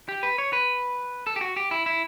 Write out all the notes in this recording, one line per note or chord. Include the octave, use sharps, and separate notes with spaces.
G4
B4
C#5
B4
A4
G4
F#4
G4
E4
E4